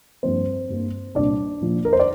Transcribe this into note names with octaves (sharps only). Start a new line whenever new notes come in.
G2 F3 A#3 C4 C5
G2 G3 A#3
C2 A#2 G3 D4 D5
A#2 F3 A#3
A#4
C5
D5